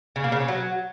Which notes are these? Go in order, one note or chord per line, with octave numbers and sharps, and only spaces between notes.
C#3
A#3
C#3
C#4
F#3